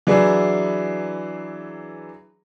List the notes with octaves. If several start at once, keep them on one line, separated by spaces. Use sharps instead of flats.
E3 F#3 D4 E4 G#4